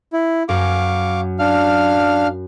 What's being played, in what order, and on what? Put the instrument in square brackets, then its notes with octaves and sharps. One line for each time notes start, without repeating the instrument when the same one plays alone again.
[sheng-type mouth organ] E4
[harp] F#2 [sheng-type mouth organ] F5 C#6 D6
[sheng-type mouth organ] D4 F5 F6